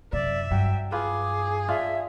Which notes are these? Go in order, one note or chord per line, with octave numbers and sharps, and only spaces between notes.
F#2 C3 D5 E5
G2 F#3 G5
F4 G#4 B4 D6
D4 F4 E5